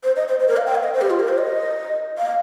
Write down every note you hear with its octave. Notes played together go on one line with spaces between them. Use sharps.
C5
D#5
C5
C5
A#4
F5
G5
F5
D#5
C5
G4
F4
A#4
C5
D#5
F5